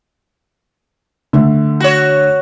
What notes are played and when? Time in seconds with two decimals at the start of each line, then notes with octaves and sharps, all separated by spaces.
1.33 D3 A3
1.80 F#4 C#5